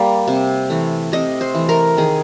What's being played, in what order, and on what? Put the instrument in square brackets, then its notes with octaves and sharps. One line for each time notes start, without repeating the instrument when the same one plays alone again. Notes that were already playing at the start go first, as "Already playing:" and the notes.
Already playing: [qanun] G3 A#3
C3
E3 A3
C3 D#5
C5
E3 A3
A#4
D#3 G#4